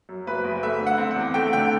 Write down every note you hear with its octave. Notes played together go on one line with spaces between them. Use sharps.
F#2
F#1 B4
F#1
A3 E5
D3
F#5
C4
F#5
E2
A3 G5
D3 G5